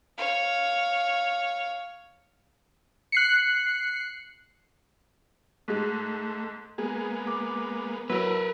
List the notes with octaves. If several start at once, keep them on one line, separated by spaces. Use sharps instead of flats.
C#5 F5
F#6 C7 C#7
G#2 G#3 A3
G#3 A#3 B3 G#4
D6
F#3 E4 A#4 B4